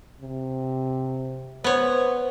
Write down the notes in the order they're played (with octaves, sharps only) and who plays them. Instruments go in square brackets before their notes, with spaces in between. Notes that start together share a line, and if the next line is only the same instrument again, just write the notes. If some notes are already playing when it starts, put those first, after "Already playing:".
[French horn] C3
[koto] B3 C#5 [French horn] C5